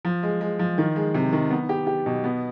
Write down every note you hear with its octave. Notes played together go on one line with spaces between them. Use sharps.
F3
G#3
G#3
F3
D#3
G#3
C3
D#3
B3
G4
G4
B2
B3